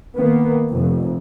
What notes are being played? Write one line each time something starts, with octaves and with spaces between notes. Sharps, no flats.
D#3 A#3 B3
F1 F2